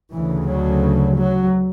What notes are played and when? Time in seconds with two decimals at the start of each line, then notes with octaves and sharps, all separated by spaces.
0.13 D2 C#3 E3
0.47 F#3
1.17 F#3